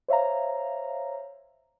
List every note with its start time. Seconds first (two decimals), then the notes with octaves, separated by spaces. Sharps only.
0.08 C5 C#5 E5 F5 A#5